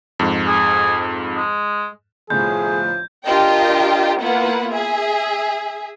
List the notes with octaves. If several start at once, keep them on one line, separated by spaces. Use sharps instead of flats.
F2 G#2
G#4
G#3
G1 C2 A2 F3 G#4 G6
D4 F4 G4 A#4 D#5 G5
A#3 B3 E4 F4 B4 F#5
G#4 E5